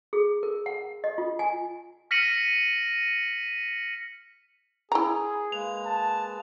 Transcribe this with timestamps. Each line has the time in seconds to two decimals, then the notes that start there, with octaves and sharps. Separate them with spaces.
0.13 G#4
0.43 A#4
0.66 F#5
1.04 D#5
1.18 F4
1.39 G#5
2.11 F6 A#6 B6 C#7 D#7 F#7
4.92 E4 G#4 A#5
5.52 G#3 A#3 B4 F7
5.85 A5